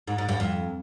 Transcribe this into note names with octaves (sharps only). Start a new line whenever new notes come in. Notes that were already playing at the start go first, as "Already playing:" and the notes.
G#2
G#2
G2
F2